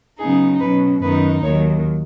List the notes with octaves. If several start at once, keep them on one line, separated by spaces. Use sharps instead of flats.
C#3 F#3 B3 D#4 G#4
B2 F#3 C#4 B4
F#2 D#3 B3 D#4 B4
D#2 D#3 F#3 C#5